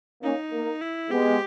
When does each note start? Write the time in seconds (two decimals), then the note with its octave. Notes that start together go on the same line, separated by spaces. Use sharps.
0.22 A#3 C#4 D#4
0.52 A#3
0.81 E4
1.10 G#3 B3 G4